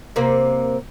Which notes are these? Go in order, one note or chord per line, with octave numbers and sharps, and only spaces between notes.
C3 A#3